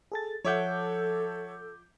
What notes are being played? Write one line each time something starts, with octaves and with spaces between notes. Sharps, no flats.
G#4 A4 A6
F3 A4 C#5 E5 F#5 D6 G6